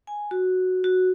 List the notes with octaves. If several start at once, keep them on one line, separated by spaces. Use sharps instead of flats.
G#5
F#4
F#4